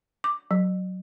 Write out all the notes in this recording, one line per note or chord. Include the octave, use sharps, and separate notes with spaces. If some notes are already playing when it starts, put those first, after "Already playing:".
D6
F#3